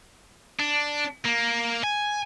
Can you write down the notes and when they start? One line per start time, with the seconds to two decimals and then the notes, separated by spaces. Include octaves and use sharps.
0.60 D4
1.25 A#3
1.84 G#5